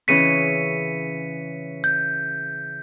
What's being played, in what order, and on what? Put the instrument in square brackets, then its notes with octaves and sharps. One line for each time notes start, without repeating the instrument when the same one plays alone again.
[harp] C#3 E3 C#4 [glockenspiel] B6 C#7 D#7
[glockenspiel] G6